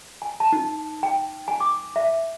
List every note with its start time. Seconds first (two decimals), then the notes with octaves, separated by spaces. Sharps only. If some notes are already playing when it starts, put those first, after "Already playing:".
0.22 G#5
0.40 A5
0.53 D#4
1.03 G5
1.48 G#5
1.60 D6
1.96 E5